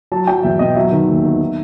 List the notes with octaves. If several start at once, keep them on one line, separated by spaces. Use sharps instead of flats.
F#3 A5
F#3 G5
E2 E5
B2 D#5
F#3 E5
D#3
D#2
D#3
D#3